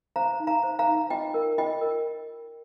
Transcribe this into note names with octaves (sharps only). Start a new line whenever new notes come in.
C5 F5 A#5
D#4
F5 A#5
C5
F5 A#5
D#4
F4 D#5 G5
A#4
F4 D#5 G5
A#4